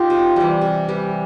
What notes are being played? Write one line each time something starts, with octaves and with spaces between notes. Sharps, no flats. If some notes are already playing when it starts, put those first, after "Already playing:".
Already playing: D#4 F4 G4
C3
E3 G3
C3
E3 G3